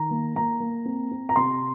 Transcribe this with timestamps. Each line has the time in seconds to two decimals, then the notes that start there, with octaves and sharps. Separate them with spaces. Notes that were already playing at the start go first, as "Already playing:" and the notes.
Already playing: D#3 A#5
0.11 A#3
0.35 A#3 A#5
0.60 A#3
0.85 C4
1.11 C4
1.29 A#5
1.36 C3 C6